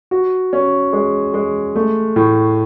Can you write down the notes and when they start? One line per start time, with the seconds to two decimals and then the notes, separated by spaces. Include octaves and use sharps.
0.11 F#4
0.53 C#4
0.93 G#3
1.34 G#3
1.76 A3
2.16 A2